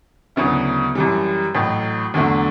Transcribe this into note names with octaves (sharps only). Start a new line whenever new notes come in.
D2 C#3 F#3 B3 E4
F#2 E3 G3
A1 A2 F#3
E2 D3 F#3 A3 D4